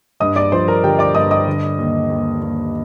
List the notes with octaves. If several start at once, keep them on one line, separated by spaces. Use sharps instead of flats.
G2 D#5 D#6
D5 D6
F3 C5 C6
A#4 A#5
D3 G4 G5
D5 D6
G2 D#5 D#6
D#5 D#6
D3
D#2
D#2
D#2